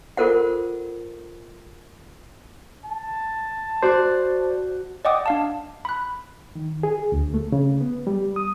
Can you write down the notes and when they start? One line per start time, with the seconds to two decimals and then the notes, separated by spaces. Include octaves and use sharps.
0.17 F4 A4 A#4 C5 F#5
2.85 A5
3.83 F#4 C5 D5
5.05 D5 D#5 F#5 G5 D6 D#6
5.26 D4 F5 A5
5.85 B5 F#6
6.55 D#3
6.83 G#4
7.12 D2
7.34 A3
7.52 C#3
7.81 B3
8.07 G3
8.36 D#6